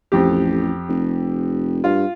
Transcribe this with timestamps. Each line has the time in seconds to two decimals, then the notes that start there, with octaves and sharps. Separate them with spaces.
0.12 A1 F2 G4
0.89 F1
1.84 G2 F4